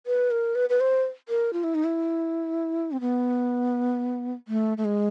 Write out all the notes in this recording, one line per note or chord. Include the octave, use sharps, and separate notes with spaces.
B4
A#4
B4
B4
C5
A#4
F4
E4
D#4
E4
C4
B3
A3
A3
G#3